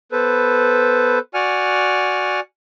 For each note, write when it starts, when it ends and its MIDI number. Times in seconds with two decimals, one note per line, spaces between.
0.12 1.19 59
0.12 1.19 69
0.12 1.19 71
0.12 1.19 72
1.34 2.40 66
1.34 2.40 74
1.34 2.40 78
1.34 2.40 80
1.34 2.40 89